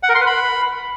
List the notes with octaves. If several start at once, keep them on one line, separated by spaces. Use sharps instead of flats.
F#5
A#4
C6
B4
B5